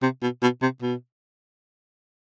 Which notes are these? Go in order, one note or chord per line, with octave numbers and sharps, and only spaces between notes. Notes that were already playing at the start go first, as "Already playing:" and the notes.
C3
B2
B2
C3
B2